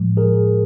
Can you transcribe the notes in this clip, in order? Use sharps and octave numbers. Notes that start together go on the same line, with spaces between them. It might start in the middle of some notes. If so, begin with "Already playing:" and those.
Already playing: A2 F3 G#3
G#4 A#4